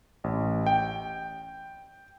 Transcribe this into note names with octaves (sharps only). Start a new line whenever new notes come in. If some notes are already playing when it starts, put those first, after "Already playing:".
A1
G5